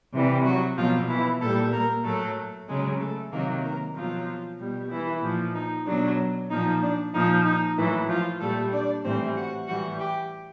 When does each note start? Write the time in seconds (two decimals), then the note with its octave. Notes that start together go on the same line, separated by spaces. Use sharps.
0.13 C3 E3 G3
0.44 F#3 F#4
0.77 B2 F3 F#3 F4
1.08 E3 E4
1.40 A#2 A3 A4
1.45 G3
1.72 A#3 A#4
2.04 A2 F#3 A3 A4
2.68 C#3 F#3 G#3 G#4
2.99 A3 A4
3.31 C3 D#3 F#3 A#3 A#4
3.63 A#3 A#4
3.95 B2 F3 F#3 F4
4.58 B2 G3
4.90 E3 E4
5.22 A#2 F3
5.54 D#4
5.86 B2 F#3 D4
6.49 A#2 F3 D#4
6.82 D4
7.13 A#2 F3 D#4
7.44 D#4
7.77 A2 E3 F#3 E4
8.08 F3 F4
8.40 A#2 G3 A3 A4
8.71 D4 D5
9.03 A2 E3 G3 C4 C5
9.35 F#4 F#5
9.67 A2 E3 G3 F#4 F#5
9.99 G4 G5